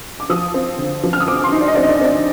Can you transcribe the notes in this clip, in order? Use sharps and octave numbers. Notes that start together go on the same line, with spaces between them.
D6
F3 D#6
C4
D3
F3
F6
D#6
C4 D6
C6
D#4
D5
D#5
C4 D5
D#5
D5
D#5
C4 D5